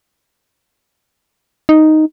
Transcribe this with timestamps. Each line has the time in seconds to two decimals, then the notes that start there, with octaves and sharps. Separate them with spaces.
1.69 D#4